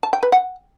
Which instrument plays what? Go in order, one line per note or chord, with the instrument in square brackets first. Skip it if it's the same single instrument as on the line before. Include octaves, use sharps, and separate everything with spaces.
[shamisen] A5
G5
B4
F#5